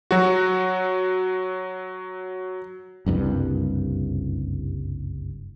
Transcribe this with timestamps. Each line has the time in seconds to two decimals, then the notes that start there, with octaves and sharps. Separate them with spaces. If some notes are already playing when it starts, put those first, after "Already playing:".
0.11 F#3 F#4
3.06 F#1 C2 G2